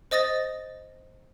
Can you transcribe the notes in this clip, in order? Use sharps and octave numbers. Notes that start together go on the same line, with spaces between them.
C5 D#5 D#6 A6 A#6